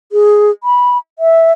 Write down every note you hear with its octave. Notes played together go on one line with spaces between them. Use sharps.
G#4
B5
E5